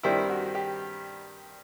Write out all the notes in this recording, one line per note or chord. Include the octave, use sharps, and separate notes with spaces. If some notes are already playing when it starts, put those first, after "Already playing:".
G2 D#3 G3 C4 E4
F#4
G4